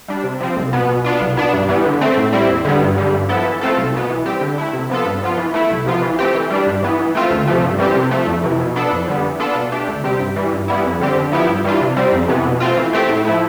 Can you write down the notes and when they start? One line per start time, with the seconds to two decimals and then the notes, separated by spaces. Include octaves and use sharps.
0.08 G3 D4
0.23 C3
0.40 F3 C4
0.56 C2
0.73 B2 B3
0.89 B2
1.05 B3 D4 F4
1.21 C2
1.37 B2 B3 D4
1.53 G2
1.69 E3 G3 B3
1.85 D3
2.01 A3 C4
2.17 A2
2.33 G3 C4 E4
2.49 E2
2.65 D3 G3 B3
2.81 G2
2.98 D3 G3
3.13 G2
3.29 F3 B3 E4 A4
3.45 E3
3.61 A3 C4 F4 A4
3.77 C2
3.94 B2 B3
4.10 E3
4.26 G3 C4 G4
4.41 D3
4.58 A3 E4
4.73 C3
4.90 F3 B3 F4 A4
5.06 G2
5.22 F3 B3 F4
5.37 E3
5.54 A3 E4
5.70 C2
5.86 C3 F3 B3 F4
6.02 E3
6.19 A3 C4 G4
6.34 E3
6.50 G3 D4
6.66 G2
6.83 E3 B3
6.99 E3
7.15 A3 C4 F4
7.30 D2
7.47 C3 F3 A3
7.63 G2
7.78 E3 G3 C4 G4
7.96 C3
8.11 F3 A3
8.27 F2
8.44 C3 E3
8.60 B2
8.76 B3 D4 A4
8.92 F2
9.08 D3 G3 B3
9.24 E3
9.39 B3 D4 F4 A4
9.55 B2
9.72 A3 D4 G4
9.87 D2
10.04 C3 G3 C4 G4
10.20 G2
10.36 E3 G3
10.53 G2
10.68 E3 G3 B3 E4
10.85 F2
11.00 D3 G3 C4 G4
11.16 D3
11.32 F3 B3 E4 G4
11.48 G2
11.64 E3 G3 D4 F4
11.81 C3
11.97 G3 C4
12.12 F2
12.28 C3 E3 B3
12.45 B2
12.60 A3 C4 F4
12.77 E3
12.93 A3 C4 G4
13.09 A2
13.25 F3 A3 E4